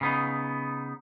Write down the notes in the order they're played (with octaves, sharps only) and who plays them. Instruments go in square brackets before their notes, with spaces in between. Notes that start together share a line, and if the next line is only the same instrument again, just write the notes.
[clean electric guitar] C#3 B3 D#4